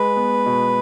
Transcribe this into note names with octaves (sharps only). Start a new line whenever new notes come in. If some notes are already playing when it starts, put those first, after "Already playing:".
Already playing: G#3 B4
B3
B2